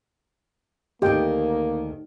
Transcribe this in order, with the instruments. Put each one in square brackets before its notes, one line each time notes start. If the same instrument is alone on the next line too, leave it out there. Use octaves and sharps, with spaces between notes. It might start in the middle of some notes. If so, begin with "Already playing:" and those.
[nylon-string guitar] D2 D#3 [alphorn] A#3 [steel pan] G4 D#5 G5